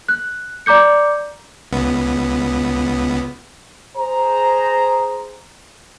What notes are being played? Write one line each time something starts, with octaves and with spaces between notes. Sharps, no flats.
F#6
D5 A#5 D6 G6 C#7
C#2 B3
G#4 C5 A#5